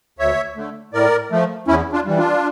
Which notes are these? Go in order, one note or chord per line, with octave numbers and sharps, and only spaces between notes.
D2 C#5 E5
D3 A3
A2 A#4 D5
F3 A3
E2 C#4 E4
D4 F4
E3 G3
D4 F4